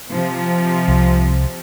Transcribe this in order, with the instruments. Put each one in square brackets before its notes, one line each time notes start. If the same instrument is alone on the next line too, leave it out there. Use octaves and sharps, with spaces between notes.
[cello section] C3 F3
[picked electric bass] C2